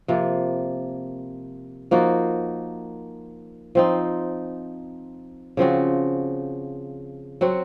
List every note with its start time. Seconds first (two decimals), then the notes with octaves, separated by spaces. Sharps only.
0.08 C3 F3 A#3
1.91 F3 A#3 D#4 F#4
3.75 F3 C4 D#4
5.57 C#3 F3 C4 F#4
7.41 F#3 C4 F#4